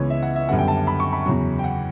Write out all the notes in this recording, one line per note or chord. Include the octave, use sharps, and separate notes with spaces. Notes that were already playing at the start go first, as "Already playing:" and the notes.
Already playing: C#2 C#3 E3 B3 B4 C#5
E5
F#5
E5
F#2 D3 G3 B3 F#5
G5
A5
B5
C#6
B5
E2 C#3 F#3
G5
F#5